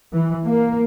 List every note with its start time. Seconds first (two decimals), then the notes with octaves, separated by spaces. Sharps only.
0.14 E3
0.47 A#3